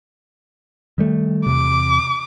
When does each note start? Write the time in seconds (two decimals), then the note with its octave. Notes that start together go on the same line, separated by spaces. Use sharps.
0.98 D#3 G3 A3
1.46 E2 C3 D6